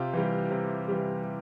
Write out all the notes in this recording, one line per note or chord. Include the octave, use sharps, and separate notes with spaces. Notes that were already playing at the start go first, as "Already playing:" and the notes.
Already playing: C3 F4 G4
E3 G3
C3
E3 G3